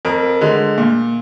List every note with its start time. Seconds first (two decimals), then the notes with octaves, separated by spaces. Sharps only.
0.05 F2 A#4
0.41 D3 G#3
0.78 A#2